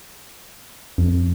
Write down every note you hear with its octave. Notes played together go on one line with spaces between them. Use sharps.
F2